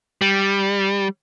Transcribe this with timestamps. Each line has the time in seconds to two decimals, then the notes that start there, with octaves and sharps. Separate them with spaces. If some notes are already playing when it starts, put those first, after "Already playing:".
0.22 G3